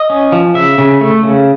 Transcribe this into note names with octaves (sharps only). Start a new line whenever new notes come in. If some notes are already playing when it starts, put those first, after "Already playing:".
Already playing: D#5
C#4
F3
C#3 E5
C#3
A3
C#3